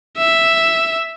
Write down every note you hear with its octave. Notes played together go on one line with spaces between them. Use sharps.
E5